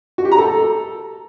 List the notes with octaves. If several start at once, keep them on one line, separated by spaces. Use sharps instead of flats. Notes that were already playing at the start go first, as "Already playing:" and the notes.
F#4
G4
A#5
A4